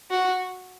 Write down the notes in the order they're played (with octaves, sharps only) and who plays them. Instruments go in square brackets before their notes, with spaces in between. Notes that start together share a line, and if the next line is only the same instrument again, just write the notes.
[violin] F#4